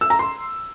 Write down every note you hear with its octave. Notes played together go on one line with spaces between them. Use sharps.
E6
A#5
C6